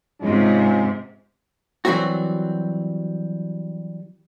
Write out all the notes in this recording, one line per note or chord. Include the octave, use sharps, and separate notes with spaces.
G#2 C3 G#3 C#4 F4
E3 F#3 G3 C4 F#4